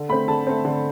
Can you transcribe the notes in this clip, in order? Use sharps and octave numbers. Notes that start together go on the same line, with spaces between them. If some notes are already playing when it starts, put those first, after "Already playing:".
Already playing: D3
A3 C4 B5
D3 A5
A3 C4
D3